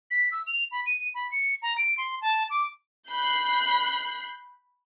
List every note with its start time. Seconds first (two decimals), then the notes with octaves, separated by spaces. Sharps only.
0.11 B6
0.32 E6
0.47 F7
0.72 B5
0.86 D#7
1.15 B5
1.32 C#7
1.62 A#5
1.78 D7
1.98 C6
2.21 A5
2.50 D6
3.10 B5 F#6 G6 C7